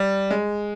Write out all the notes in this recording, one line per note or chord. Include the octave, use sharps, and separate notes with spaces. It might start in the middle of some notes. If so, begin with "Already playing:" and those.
Already playing: G3
G#3